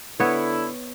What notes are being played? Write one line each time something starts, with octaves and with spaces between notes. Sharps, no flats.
D3 B3 E4 C#5